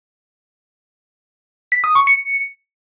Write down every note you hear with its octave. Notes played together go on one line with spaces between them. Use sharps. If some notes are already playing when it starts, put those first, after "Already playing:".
B6
D#6
C#6
C#7